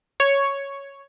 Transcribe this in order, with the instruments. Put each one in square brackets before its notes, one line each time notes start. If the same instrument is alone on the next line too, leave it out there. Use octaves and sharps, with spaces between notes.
[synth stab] C#5